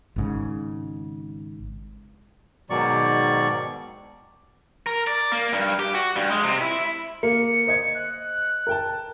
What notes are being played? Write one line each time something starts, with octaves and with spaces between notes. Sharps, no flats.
G#1 G#2 C#3
G#2 B2 D#3 F#3 D5 C#6
A#4
D5
A#3
G2
G4
F#4
G2
G#3
C3
E4
A#3 C#7
C#7
C5 D#5 G#6
F#6
A#4 G5 A5